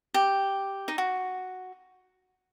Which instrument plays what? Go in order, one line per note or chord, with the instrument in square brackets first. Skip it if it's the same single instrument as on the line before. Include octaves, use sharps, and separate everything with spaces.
[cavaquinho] G4
D#4
F#4